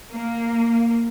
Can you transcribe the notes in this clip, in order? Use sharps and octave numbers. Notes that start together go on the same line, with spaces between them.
A#3